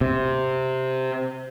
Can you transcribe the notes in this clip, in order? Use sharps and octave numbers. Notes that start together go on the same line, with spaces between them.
C3